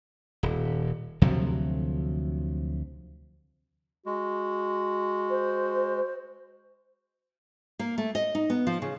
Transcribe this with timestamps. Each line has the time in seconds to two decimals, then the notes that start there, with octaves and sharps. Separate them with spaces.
0.43 D#1
1.22 D2 C3 F3 F#3
4.06 G#3 F#4
5.30 C5
7.79 A#3
7.98 A3
8.15 D#5
8.35 D#4
8.50 B3
8.67 F3
8.82 C#3